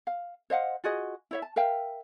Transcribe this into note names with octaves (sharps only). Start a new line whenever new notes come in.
F5
C5 D#5 F5 F#5
F4 F#4 G#4 D#5
E4 C#5 E5
A5
A#4 E5 F5 G5